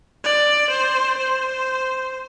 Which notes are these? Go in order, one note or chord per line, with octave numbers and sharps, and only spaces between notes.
D5
C5
C5